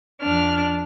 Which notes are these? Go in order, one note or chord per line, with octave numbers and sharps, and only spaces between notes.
F2 D4 F6